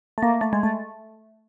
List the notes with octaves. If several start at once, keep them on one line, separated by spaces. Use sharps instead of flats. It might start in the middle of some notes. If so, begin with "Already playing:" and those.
A3
A#3
A3
G#3
A3